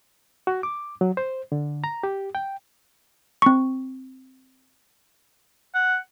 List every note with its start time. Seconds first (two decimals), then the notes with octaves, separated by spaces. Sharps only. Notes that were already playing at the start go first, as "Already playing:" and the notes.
0.47 F#4
0.63 D6
1.01 F#3
1.17 C5
1.52 D3
1.84 A#5
2.03 G4
2.35 G5
3.42 C4 C#6
5.74 F#5